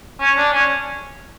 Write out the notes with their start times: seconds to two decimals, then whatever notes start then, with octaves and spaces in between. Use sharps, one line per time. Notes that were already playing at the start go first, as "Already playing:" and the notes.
0.20 C#4
0.37 D4
0.53 C#4